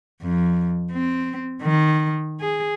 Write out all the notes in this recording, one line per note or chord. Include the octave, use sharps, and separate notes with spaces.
F2
C4
D#3
G#4